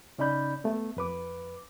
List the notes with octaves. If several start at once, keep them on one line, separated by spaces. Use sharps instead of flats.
C#3 C#4 D#4 D5 B5 G6
A3 B3
F2 B4 D6